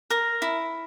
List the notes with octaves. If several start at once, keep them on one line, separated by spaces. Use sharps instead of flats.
A#4 A#5
E4